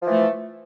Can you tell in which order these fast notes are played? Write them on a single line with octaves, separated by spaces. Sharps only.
F3 E3 A3